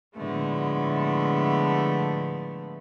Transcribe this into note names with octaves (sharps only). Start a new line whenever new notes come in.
A2 D3 F3 G#3 A3 B3